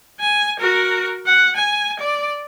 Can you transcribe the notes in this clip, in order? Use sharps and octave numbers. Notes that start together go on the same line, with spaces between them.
G#5
F#4 A#4
F#5
G#5
D5